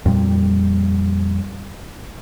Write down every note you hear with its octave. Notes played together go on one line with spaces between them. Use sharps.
F2 A#2 G3